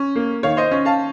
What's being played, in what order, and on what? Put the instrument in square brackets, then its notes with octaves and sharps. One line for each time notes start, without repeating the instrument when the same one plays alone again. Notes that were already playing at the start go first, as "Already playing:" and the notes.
Already playing: [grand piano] C#4
A#3
D#3 C#5 F5
C5 D#5
C#4
F5 A5